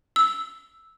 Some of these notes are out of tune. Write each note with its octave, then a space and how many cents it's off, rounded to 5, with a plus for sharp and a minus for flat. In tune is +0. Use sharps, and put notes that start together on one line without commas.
E6 -5